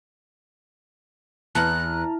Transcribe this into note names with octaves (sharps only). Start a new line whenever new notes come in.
E2 A5 A#5 F6 F#6